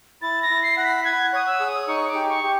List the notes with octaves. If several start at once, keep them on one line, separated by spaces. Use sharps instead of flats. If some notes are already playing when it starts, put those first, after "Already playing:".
E4 A6
A#6
E4
C7
F#5 A#6
B6
F#5 G#6
C#5 D#6
E6
G#4
D#6
D#4 C#6
D6
G4
C#6
G4